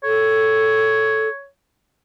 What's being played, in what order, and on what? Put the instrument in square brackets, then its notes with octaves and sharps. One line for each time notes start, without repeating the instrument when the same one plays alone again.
[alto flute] A4 [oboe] C#5